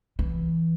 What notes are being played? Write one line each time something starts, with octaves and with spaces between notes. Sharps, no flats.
E3